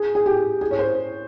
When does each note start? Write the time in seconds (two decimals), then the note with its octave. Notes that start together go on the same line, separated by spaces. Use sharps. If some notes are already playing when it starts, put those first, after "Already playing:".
Already playing: G#4
0.15 G#4
0.26 G4
0.61 G#4
0.71 C#5
0.79 C5